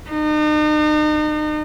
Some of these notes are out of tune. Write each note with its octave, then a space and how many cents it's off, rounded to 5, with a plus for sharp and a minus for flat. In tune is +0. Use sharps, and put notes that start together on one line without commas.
D#4 -40